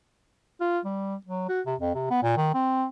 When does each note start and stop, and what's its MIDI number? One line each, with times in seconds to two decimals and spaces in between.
0.61 0.79 65
0.85 1.16 55
1.27 1.47 54
1.49 1.61 66
1.66 1.75 48
1.80 1.94 41
1.95 2.10 48
2.10 2.22 59
2.23 2.34 46
2.37 2.53 51
2.54 2.85 60